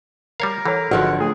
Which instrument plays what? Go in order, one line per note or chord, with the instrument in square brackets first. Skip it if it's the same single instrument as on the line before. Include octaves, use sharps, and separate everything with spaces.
[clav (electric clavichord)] G3 C#5 F5 [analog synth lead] A#4
[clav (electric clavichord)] E3 [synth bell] A4 C#5
[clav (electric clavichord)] G#1 [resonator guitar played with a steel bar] D3 F3 F#3 [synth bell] D4 F#4 [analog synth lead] F#5
[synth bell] A3 [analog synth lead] G#4